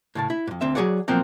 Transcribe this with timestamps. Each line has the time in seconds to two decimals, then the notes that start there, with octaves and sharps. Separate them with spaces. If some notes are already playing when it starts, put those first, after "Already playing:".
0.15 A2 C#3 A5
0.30 E4
0.47 F2 G#2
0.61 D2 C4 E5
0.75 F#3 G#4 C#5 D5 F#5
1.08 B2 F3 F#3 A#3 C4 A#4